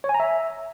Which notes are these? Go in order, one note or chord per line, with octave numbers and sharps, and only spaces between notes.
C#5
G#5
A#5
E5